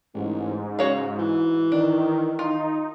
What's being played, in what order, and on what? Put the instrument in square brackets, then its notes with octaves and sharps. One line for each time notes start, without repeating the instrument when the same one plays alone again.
[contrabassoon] A1 [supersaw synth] G#2
[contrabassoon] C#3 [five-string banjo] F#4 C#5 F5
[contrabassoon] E3
[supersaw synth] D#3 [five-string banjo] D4
[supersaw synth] D#4 [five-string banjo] F4